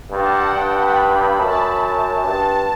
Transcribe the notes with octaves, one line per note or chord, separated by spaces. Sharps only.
G2 A5
F#5
G5
G2
B5
F#2 A5
G2 A5
A5